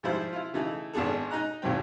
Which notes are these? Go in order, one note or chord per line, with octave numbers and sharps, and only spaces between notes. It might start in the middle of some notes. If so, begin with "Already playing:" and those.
G#2 F3 G3 E4 C5
E4 F4
C#3 E3 A3 D#4 E4
G#1 B3 D4 G#4 A4
D#4 D#5 A#5 F#6
G#1 D#2 A2 F#3 C4 G5